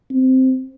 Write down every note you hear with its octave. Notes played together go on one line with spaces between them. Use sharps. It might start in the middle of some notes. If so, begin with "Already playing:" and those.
C4